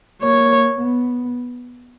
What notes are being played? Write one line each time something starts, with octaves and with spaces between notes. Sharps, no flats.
A#3 C#5
B3